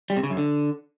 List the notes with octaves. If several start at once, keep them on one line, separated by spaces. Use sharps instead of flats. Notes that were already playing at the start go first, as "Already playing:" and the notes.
G3
C3
C#3
F#2
D3